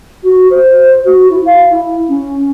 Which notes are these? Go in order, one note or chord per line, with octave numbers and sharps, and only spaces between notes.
F#4
C5
F#4
E4
F5
E4
C#4